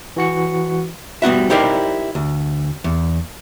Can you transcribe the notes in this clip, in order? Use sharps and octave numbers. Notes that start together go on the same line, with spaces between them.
E3 F#4 C#7
G3 B3 F#4 E5
D#4 E4 G4 A#4 C5 D5
D2
E2